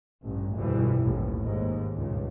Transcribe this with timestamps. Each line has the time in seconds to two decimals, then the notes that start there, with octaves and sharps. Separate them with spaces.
0.24 A1 G2
0.55 G1 C2 F2 B2 E3 G3
1.03 A1 D#2 G#2
1.42 D#2 G#2
1.95 C#2 G2 A#2